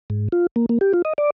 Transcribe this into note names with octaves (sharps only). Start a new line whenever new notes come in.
G#2
F4
A#3
A#3
G4
F4
D#5
D5